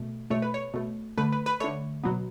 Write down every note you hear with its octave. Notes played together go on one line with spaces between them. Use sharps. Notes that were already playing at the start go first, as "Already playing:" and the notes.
Already playing: B2 A3
B2 A3 C#5
B4
C#5
B2 A3
D3 A3 B4
B4
B4
D3 A3 C#5
B2 F#3 B3